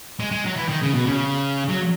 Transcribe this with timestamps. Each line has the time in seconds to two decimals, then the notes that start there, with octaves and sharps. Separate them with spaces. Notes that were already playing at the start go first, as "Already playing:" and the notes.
0.20 G#3
0.32 G#3
0.45 F#3
0.57 E3
0.69 D#3
0.82 C#3
0.94 B2
1.07 C#3
1.69 F#3